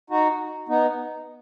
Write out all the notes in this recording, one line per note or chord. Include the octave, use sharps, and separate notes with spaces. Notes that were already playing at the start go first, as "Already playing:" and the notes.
D#4 F#4
B3 D#4